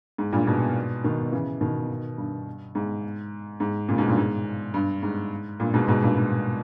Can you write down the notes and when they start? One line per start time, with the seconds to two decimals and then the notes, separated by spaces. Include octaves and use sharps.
0.18 G#2
0.33 G2 A#2
0.47 G#2 B2
1.04 B2 D#3
1.32 C#3 E3
1.61 B2 D#3
2.18 G2
2.75 G#2
3.60 G#2
3.89 A#2 C#3
3.98 G#2 B2
4.08 G2 A#2
4.17 G#2
4.74 G2
5.03 G#2
5.60 G2 A#2
5.74 G#2 B2
5.88 G#2 B2
6.02 G2 A#2
6.17 G#2